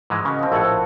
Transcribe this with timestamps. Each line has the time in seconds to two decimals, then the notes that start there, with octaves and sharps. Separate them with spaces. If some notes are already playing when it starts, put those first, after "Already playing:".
0.10 G#2 E3 G#3
0.25 C#3 F#4 A#4 D#5
0.39 F3 C4
0.52 A#1 A2 E4 A4 F#5